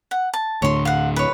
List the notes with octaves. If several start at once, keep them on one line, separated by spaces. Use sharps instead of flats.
F#5
A5
D2 A2 D3 C#5 C6
F5 F#5
B4 C#5